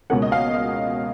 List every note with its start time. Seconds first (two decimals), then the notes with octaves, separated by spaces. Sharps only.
0.10 C#2 B2 A#3 C#4 F#5
0.22 D#5
0.32 F5
0.54 D#5